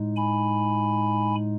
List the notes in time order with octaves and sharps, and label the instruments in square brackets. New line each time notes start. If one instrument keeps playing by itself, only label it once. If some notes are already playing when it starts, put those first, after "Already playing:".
Already playing: [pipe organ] A2 G#3 D#4
G#5 B5